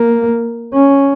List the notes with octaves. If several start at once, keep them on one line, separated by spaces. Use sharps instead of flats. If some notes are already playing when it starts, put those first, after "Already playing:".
Already playing: A#3
C#4